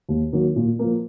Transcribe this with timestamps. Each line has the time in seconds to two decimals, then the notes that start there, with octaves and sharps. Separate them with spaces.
0.09 D#2
0.33 D#3 F#3 A#3
0.56 A#2
0.79 F3 A#3